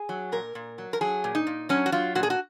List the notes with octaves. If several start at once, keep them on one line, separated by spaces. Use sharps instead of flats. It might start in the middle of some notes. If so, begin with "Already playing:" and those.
Already playing: G#4
F#3
A#2 A#4
A#2
F#3
A#4
F#3 G#4
A#2
D#4
A#2
F#3 C#4
F#4
F#3 F4
A#2 F#4
G#4
F#4